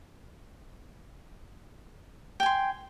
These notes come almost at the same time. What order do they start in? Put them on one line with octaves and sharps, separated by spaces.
G5 G#5 C6